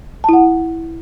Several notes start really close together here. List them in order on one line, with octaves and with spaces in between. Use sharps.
A5 E4 F#5